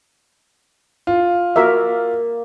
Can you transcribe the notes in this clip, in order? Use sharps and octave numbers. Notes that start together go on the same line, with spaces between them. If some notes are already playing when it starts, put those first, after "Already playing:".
F4
A#3 F#4 A#4 E5